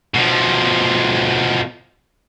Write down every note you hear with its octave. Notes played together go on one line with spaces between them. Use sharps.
B2 F3